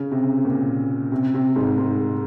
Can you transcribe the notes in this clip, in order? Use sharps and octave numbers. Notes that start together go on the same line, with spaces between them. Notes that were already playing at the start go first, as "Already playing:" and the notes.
Already playing: C#3
C3
A#2
C3
C3
G#2
G#2